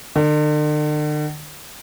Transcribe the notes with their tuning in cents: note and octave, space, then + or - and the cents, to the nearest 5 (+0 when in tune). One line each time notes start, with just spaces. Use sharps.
D3 +45